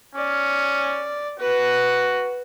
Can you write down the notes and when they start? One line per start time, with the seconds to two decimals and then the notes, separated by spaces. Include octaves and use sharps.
0.15 C#4 D5
1.40 F#4 B4